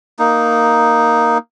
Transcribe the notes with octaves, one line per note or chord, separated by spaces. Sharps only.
A#3 D#4